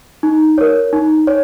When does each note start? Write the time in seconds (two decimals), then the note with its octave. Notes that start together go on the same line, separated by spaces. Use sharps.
0.23 D#4
0.58 A#4 C#5
0.93 D#4
1.27 C#5